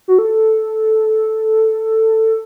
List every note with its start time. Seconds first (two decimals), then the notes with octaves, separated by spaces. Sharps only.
0.08 F#4
0.19 A4